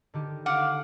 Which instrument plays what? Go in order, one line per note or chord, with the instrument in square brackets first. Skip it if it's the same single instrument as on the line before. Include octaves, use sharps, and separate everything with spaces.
[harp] D3 D#3 G4
[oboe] F5 [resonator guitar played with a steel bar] F#5 [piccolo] D6